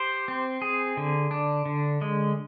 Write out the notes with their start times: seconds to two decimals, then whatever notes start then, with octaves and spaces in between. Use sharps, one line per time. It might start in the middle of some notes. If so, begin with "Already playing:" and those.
Already playing: G4 C5
0.28 C4
0.62 G#4
0.97 D3
1.31 D4
1.66 D3
2.01 G#3